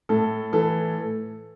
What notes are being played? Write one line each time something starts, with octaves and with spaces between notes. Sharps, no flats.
A2 A4
E3 A4